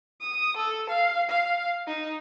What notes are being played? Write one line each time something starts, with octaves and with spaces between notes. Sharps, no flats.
D#6
A4
F5
F5
D#4